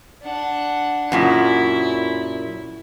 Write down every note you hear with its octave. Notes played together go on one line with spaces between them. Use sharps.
D4 F#5
F#2 A#2 C#3 E4